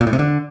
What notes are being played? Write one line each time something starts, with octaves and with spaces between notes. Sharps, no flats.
A#2
A2
C3
D3